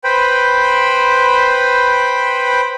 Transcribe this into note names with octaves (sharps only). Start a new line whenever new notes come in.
B4 C5 G5 B5